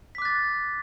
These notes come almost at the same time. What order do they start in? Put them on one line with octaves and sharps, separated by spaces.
B6 D6 F#6 A6